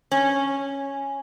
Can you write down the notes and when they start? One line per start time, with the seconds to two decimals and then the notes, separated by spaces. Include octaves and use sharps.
0.12 C#4